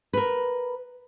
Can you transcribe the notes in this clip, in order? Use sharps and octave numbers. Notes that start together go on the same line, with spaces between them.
A#4 B4